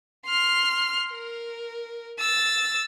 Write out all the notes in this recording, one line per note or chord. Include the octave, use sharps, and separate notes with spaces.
C6 F6
A#4
E6 A6